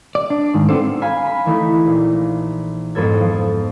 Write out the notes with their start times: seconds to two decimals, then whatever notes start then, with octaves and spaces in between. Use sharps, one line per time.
0.15 D5
0.30 D4
0.54 G#2 D#3
0.69 B3 C4 D4 F4 A4 C5
1.02 F5 G#5 B5 C7
1.27 B5
1.46 E3 A3 D#4
1.86 A#1
2.95 F2 G#2 B3 A4 G#6
3.20 F3